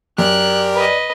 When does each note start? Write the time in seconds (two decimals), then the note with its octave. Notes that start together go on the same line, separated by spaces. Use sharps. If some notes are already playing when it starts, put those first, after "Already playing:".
0.18 F#2 G4 A#4 D5 F#6
0.75 B4 D#5